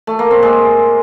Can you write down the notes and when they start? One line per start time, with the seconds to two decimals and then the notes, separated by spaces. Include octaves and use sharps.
0.07 A3
0.19 A#3
0.31 C4
0.43 G#3